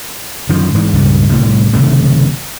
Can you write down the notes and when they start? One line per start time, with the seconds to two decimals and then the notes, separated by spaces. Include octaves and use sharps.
0.49 F#2 D3 D#3 F3
0.75 G#2 E3 G#3
0.93 C#2 G2 A#2
1.30 C2 A2 D3 G3
1.73 F#1 C3 D#3 A3